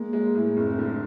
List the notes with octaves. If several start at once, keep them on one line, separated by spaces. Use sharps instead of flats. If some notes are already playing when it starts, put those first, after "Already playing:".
Already playing: G#3 A#3
G#3
A2
F#1 C4
D3